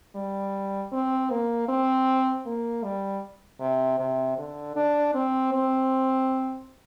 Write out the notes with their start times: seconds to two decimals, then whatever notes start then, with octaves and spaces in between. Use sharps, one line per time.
0.15 G3
0.92 C4
1.30 A#3
1.69 C4
2.46 A#3
2.84 G3
3.60 C3
4.00 C3
4.38 D3
4.76 D4
5.14 C4
5.53 C4